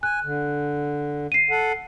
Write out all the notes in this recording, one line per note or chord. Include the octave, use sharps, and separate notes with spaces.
G#5 F#6
D3
C7 D#7
A4 F#5